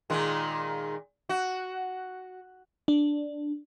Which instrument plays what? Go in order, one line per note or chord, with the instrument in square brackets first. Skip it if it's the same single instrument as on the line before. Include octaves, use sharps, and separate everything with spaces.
[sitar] A#2 D#3 G#3
F#4
[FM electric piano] D4